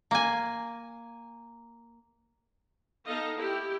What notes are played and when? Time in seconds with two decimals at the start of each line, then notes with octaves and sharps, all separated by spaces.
0.11 A#3 G#5
3.07 B3 D#4 A4 D#5 F5 A#5
3.37 E4 G4